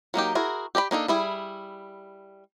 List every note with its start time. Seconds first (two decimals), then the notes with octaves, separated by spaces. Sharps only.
0.14 F#3 A#3 D#4 G4
0.35 E4 F#4 G#4 A#4
0.75 G4 D5 A#5 B5
0.91 A#3 D4 D#4 A4
1.08 G3 E4 G#4